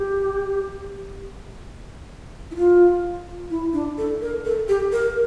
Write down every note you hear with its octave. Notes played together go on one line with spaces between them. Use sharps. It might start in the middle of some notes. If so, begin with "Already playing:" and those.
Already playing: G4
E4
F4
E4
D4
A4
A#4
A4
G4
A#4